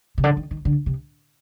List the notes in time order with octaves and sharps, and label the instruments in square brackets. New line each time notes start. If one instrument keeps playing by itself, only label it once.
[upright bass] C3
D3
D#3
D#3
D3
C3